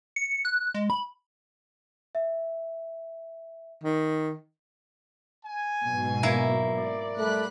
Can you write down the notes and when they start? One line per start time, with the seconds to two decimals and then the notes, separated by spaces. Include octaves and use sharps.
0.16 C#7
0.45 F#6
0.74 G#3
0.90 B5
2.15 E5
3.84 D#3
5.45 G#5
5.84 G#2 B2 F#3
6.23 A#3 E4
6.77 D5
7.18 G3 A3 B5 F#6